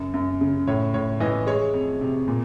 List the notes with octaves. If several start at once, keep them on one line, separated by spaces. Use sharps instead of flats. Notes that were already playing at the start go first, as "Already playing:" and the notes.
Already playing: F#2 C#3
F#2
C#3
A2 C#5
A2 C#5
E3 D#5
G#3 C#5
F2
C3
A#2